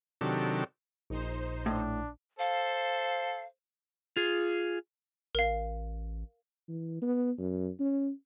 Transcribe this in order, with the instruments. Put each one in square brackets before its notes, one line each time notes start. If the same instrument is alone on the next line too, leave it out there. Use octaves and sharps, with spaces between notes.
[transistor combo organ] C3 D#3 F#3 D4 G4 A4
[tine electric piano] A#1 A#2 [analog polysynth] D#4 C5
[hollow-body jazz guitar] A2 [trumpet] D4
[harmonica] A4 [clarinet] C5 [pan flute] F5
[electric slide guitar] F4 G#4
[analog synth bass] A1 [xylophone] A#4 F5
[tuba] E3
B3
F#2
C#4